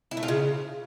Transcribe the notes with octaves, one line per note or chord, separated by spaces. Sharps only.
E4
A3
F4
C#3